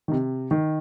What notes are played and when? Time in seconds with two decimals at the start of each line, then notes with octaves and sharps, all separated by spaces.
0.08 D#3
0.12 C3
0.51 D#3